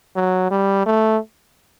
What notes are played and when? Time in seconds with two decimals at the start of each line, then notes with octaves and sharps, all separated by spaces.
0.16 F#3
0.51 G3
0.86 A3